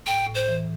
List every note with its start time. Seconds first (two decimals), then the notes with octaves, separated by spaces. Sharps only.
0.07 A2 G5
0.27 A2
0.35 C5
0.48 E3